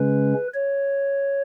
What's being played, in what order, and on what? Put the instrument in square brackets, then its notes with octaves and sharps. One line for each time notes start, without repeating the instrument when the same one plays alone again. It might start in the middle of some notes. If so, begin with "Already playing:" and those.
Already playing: [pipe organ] C#3 G#3 C#4 B4
C#5